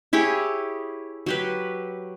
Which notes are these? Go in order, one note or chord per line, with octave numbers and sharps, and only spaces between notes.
E4 G4 G#4 C#5
F#3 G4 B4